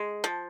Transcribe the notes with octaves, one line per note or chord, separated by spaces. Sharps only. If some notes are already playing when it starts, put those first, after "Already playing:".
Already playing: G#3
F3